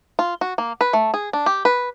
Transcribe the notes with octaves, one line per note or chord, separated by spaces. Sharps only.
F4
F#4
A#3
B4
A3
G#4
D4
G4
B4